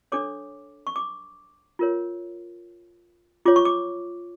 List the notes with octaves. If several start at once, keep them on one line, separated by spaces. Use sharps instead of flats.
D4 A4 C#5 D6
C#6
D6
F4 A#4 C#5
F4 C#5 D6
C#6
D6